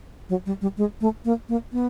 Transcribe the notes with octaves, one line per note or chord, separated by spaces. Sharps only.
F#3
G3
G3
G#3
A3
A#3
A#3
B3